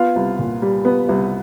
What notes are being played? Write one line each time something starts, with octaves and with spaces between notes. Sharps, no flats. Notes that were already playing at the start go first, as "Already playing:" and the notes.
Already playing: B3 F4 F5
C2
A#2
G3
B3
C2